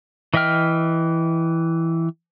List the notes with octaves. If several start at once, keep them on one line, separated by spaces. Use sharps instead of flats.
E3 D#5 E5 G5 F6